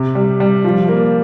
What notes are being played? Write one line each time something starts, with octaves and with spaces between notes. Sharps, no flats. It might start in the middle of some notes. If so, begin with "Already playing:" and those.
Already playing: C3
G3
G3
F3
A#3